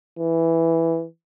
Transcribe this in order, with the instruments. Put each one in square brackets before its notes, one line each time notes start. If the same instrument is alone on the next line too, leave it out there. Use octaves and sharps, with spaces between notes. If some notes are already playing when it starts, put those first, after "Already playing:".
[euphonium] E3